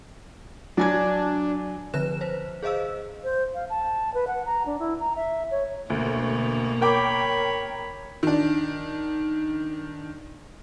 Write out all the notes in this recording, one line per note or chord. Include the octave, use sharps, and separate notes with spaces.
F#3 D4 G#5 G#6
D3 F3 B4 F#6 E7
B4 C5
G#4 C5 D#5 F5 E6
C5
F5
A5
B4
F#5
A#5
D4
E4
A#5
E5
C#5
D2 B2 A#3
A#4 C#5 G5 B5 D6
D#3 D4